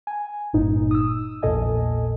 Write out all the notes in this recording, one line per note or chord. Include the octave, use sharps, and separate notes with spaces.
G#5
G1 G2 A#2 D#4
D#6 E6
A#1 E2 A#2 A4 D#5 G#5